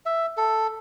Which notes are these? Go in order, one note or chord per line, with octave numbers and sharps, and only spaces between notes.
E5
A4